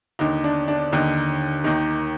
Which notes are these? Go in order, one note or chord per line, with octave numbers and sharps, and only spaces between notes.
D#2 D3 D#4
D4
D4
D#2 D3 D#4
D#2 D#3